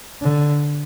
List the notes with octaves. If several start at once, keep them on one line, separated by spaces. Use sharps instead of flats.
D3